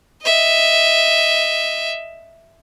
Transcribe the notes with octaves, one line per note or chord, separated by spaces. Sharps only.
D#5 E5